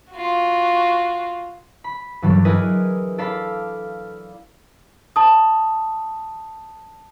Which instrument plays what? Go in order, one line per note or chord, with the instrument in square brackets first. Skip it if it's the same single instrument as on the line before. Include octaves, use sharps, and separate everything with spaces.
[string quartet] F4 F#4
[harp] B5
G2 E3 F#3 G3
E4 G#4 A#4 B4 D#5
A4 D5 F5 B5
[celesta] A5 D#6